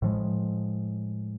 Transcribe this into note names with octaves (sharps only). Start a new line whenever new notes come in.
A2 F3 G#3